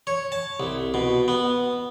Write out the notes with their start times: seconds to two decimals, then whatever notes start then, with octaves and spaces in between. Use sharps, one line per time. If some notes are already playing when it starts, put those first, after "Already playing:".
0.07 C#5
0.32 A5
0.60 C2
0.94 B2
1.28 B3